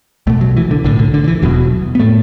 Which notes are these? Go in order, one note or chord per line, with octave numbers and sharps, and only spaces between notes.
B1 B2 A3
F#3
E3
D3
B1 A2 D3
D3
D3
D3
E3
E1 E2 B2 F#3
B3
A2 A3